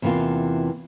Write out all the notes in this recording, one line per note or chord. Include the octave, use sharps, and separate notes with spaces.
E2 C3 E3 A#3 F4